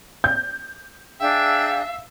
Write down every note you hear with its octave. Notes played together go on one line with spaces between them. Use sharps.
G6
D4 G#4 E5 F5 G5